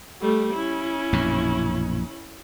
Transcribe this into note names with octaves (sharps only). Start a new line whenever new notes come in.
G3 A3
C#4 E4
A#1 F#2 B2